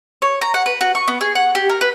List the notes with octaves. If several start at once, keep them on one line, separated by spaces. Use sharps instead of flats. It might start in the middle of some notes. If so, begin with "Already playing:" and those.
C#5
A#5
F#5
B4
F#4
C#6
B3
G#4
F#5
G4
A#4
B4